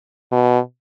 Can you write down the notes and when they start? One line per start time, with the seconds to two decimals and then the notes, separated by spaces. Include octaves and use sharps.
0.32 B2